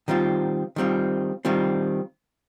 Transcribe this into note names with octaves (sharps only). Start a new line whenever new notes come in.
D#3 G3 C4 F4
D#3 G3 C4 F4
D#3 G3 C4 F4